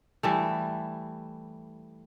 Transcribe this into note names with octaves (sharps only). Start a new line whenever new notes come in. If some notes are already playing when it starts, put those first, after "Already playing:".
E3 G3 A3